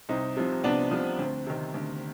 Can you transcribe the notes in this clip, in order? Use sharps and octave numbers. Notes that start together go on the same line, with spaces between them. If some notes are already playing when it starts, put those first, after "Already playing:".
C2 C4 D#4
C3 F3
C2 B3 D4
C3 F3
D2 C4
C3 D#3
D2